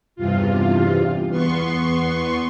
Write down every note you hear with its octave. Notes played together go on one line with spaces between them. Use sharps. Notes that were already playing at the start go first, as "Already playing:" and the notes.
E2 G2 C3 F4
E2 B3 C6 C#6